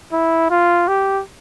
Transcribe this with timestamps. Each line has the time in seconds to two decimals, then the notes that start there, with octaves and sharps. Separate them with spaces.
0.13 E4
0.51 F4
0.88 G4